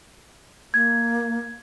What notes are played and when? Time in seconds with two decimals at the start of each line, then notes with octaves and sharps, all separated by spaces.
0.74 A#3 G#6